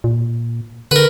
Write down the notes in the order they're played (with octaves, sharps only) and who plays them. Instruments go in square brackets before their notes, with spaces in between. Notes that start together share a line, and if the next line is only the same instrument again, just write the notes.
[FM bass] A#2
[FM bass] D3 [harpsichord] A#4 B4